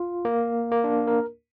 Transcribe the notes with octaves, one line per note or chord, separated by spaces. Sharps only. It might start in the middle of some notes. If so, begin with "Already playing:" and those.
Already playing: F4
A#3
A#3
D4
A#4